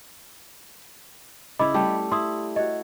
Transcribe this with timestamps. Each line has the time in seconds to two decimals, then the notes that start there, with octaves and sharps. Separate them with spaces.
1.59 C#3 E4 D#5 B5 D6
1.74 G3 A3 G4
2.12 E4 C6 D#6
2.56 F#4 C#5 D#5